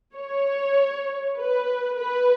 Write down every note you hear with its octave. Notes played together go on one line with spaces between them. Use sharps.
C#5
B4
B4